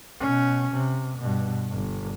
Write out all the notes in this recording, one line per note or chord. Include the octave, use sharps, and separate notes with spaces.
B2 C#4
C3
G2 B2
G1